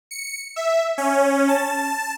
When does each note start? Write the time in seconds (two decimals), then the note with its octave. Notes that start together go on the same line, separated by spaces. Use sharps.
0.11 C#7
0.56 E5
0.98 C#4
1.48 A5